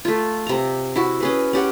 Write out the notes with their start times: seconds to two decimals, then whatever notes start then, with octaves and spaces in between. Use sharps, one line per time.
0.05 A3 F4
0.47 C3 A#5
0.96 E4 F#4
1.20 C#4 G#4 B4
1.53 C#4 G4 F#5